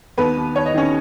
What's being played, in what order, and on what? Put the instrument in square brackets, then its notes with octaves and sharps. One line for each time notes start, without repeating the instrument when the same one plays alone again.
[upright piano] D#2 B3 B4
D#2
D#2 C#5
D#5
D#3 C#4 C#5